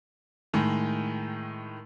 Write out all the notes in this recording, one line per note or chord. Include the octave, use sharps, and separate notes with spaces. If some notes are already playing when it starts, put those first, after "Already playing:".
A2 D#3 G#3